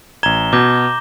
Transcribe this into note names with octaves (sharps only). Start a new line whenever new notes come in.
A1 A#5 G#6 E7 G7
B2 D6 G6 A#6